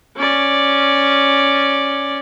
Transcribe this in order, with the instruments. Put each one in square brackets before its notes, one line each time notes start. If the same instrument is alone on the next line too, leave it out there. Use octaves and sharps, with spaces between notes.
[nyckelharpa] C#4 D5